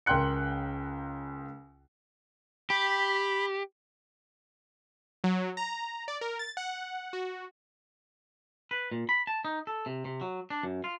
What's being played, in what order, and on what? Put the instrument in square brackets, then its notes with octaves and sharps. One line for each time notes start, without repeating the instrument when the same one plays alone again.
[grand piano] C#2 A#4 G5 C6 F#6 C#7
[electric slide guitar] G4 [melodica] B5
[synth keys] F#3
A#5
D5
A#4
A6
F#5
F#4
[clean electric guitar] B4
A#2
B5
A5
D#4
A4
C3
C3
F#3
D4
F#2
F4